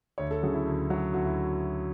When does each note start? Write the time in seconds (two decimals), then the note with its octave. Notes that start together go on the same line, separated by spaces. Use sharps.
0.18 D2 C#5
0.31 A4
0.42 C#3 F#3 G#4
0.53 E4
0.65 D2
0.89 C#3 F#3
1.13 D2 F#4
1.25 E4